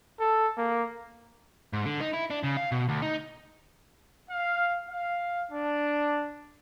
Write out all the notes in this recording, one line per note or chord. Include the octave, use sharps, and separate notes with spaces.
A4
A#3
G#2
D3
D#4
E4
D4
C#3
F5
B2
D2
D#4
F5
F5
D4